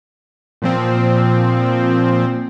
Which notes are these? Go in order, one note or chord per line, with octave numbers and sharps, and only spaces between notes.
A#2 F3 C4